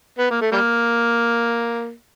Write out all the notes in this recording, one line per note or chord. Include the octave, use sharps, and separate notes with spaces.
B3
A#3
A3
G3 A#3